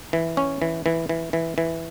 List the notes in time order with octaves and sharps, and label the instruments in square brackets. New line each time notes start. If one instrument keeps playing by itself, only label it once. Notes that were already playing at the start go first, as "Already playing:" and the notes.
[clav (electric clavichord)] E3
C#4
E3
E3
E3
E3
E3